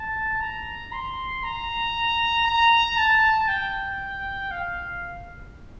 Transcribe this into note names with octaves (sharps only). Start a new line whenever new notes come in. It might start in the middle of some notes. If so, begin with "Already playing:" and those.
Already playing: A5
A#5
C6
A#5
A#5
A5
G5
F5